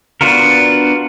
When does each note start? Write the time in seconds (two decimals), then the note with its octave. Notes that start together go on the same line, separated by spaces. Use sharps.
0.21 B3 D4 F4 F#4 A#4